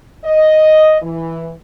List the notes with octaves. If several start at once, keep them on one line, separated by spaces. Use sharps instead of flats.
D#5
E3